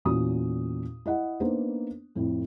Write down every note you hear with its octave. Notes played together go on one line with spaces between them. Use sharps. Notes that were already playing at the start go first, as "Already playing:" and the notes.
E2 A#2 C#4 F#4 D#6
E4 D#5 F#5
A#3 B3 D4 D#4 C5
F2 A2